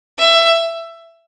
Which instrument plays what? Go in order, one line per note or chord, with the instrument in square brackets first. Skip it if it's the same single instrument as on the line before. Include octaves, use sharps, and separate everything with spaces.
[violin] E5